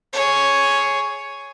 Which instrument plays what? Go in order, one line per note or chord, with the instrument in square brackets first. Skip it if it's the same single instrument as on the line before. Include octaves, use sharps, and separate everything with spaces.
[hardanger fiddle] G#4 C#5